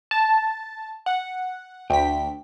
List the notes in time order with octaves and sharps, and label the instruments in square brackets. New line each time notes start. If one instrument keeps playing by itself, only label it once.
[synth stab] A5
F#5
[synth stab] D2 B6 [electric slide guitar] G5